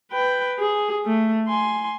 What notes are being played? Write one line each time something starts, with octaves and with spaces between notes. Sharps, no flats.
B4 G5
G#4
A3
G#5 C6